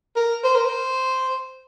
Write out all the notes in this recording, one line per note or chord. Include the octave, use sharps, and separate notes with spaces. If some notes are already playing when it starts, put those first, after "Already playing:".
A#4
C5
A#4
C5